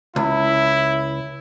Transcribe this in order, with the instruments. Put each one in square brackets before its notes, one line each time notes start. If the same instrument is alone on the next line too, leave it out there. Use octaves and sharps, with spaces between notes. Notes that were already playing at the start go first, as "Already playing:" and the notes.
[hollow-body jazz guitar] C#2 [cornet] E4